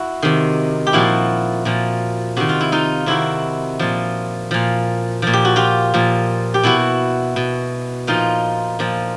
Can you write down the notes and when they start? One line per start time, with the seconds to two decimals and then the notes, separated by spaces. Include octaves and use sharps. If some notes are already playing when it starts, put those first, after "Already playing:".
Already playing: E4 F#4
0.22 C3 D#3
0.87 G4
0.93 A#2 F3 E4 F#4
1.65 A#2 F3
2.37 C3 D#3 F#4
2.49 F4
2.61 E4
2.72 D#4 F4
3.06 C3 D#3 E4 F#4
3.79 A#2 F3
4.51 A#2 F3
5.22 A#2 F3
5.33 G4
5.45 F#4
5.56 F4 G4
5.94 A#2 F3
6.54 G4
6.63 B2 E4 F#4
7.36 B2
8.07 A#2 F3 D#4 F4
8.79 A#2 F3